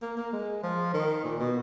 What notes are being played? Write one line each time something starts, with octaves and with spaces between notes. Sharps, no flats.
A#3
A#3
G#3
F3
D#3
A#2
B2